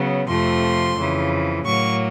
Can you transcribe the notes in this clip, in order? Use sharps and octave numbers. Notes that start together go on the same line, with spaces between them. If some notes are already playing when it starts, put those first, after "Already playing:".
Already playing: C#3 F#3 B3
F2 C3 F3 A3 C6
F2 C#3 E3
A2 F#3 A#3 C#6